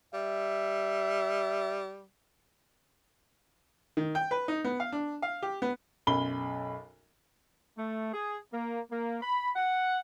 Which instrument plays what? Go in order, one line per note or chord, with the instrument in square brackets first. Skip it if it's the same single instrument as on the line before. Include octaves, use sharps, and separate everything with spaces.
[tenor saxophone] G3 [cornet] E5
[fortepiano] D#3
G5
B4
D#4
B3
F5
D4
F5
G4
B3
[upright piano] B1 F#2 B5 G7
[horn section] A3
G#4
A#3
A#3
B5
F#5